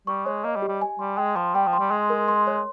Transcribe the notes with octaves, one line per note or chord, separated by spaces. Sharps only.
G3 C#6
G#3 C#5
A#3 D#5
G3
G4
G3
G#5
G3 C6
G#3 G5
F3 C6
G3 G5
F3
C6
G3
G#3 C6
A#4
C6
C#5